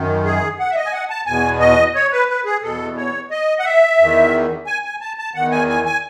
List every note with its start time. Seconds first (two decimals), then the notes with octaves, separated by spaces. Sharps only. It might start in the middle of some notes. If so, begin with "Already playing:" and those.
Already playing: F#2 D#3
0.25 G#4
0.59 F#5
0.71 E5
0.76 D#5
0.85 G#5
0.93 F#5
1.10 A5
1.27 E2 B2 G#5
1.60 D#5
1.95 C#5
2.12 B4
2.29 B4
2.45 G#4
2.63 E2 B2 A4
2.97 C#5
3.31 D#5
3.59 F#5
3.65 E5
3.99 E2 D#3
4.67 G#5
4.84 G#5
5.01 A5
5.18 A5
5.34 E2 D#3 F#5
5.51 G#5
5.69 G#5
5.86 G#5